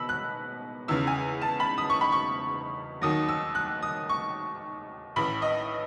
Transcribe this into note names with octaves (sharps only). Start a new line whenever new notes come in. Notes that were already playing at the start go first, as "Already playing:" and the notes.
Already playing: B2 B5 E6
F#6
E2 C#3 E3 E6
G#5
A5
B5
D#6
C#6
B5
C#6
D#2 D#3 F#3 D#6
E6
F#6
D#6
C#6
A1 A2 E3 B5
D#5